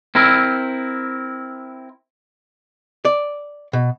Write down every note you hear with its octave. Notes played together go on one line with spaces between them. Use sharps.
C4 E4 A#4
D5
B2